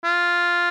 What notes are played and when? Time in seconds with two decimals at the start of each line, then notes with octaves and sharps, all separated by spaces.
0.04 F4